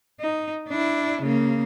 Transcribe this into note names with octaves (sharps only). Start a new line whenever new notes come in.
D#4
D4 E4
C#3 A#3